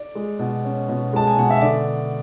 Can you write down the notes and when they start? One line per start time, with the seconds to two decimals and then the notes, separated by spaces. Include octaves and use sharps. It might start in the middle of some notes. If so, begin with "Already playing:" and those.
Already playing: D5
0.15 G#3
0.39 B2
0.64 C#4
0.89 B2
1.13 G#3 A5
1.27 G#5
1.37 B2 F#5
1.50 E5
1.61 D3 D5